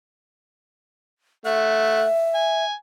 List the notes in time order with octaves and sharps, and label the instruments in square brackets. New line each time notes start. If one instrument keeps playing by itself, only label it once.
[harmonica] A3 F#5 [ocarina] E5
[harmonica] G#5